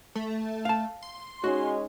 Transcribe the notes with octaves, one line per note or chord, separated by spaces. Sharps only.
A3
F5 A5
C6
G#3 C#4 D#4 F#4